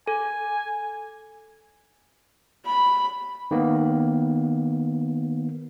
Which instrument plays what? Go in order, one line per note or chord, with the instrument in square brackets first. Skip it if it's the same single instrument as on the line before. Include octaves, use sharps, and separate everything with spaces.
[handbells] A4 [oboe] G#5
[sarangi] B5
[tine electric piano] D#3 A#3 B3